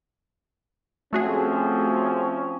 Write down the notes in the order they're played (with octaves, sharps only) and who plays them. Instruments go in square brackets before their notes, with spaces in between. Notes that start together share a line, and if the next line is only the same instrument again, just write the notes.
[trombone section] F3 C4 C#4 [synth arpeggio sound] A3 F#4 G#4